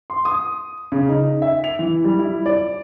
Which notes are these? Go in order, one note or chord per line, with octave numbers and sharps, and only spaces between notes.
C6
D#6
C#3
D#4
E5
F7
E3
G3
E4
D5